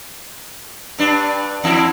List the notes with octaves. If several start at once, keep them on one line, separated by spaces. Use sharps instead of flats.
G2 D4
E2 E4